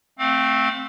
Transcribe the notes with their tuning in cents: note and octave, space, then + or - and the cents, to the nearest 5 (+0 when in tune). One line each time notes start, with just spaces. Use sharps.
A3 +0 C4 +0 F5 +30